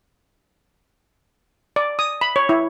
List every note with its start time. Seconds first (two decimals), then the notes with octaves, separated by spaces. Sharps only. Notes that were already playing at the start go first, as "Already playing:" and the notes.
1.76 D5
1.99 D#6
2.21 B5
2.36 C#5
2.49 E4